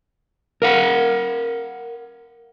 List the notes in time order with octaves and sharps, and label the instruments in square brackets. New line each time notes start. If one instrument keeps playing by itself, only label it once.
[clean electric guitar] A#4 F5 F#5